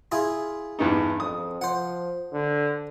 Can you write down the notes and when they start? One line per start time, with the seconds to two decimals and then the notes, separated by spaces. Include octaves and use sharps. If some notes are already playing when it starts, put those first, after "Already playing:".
0.12 E4 F4 G#4
0.79 E2 G2 D#4
1.20 F2 D#6
1.61 F3 C5 F#5
2.32 D3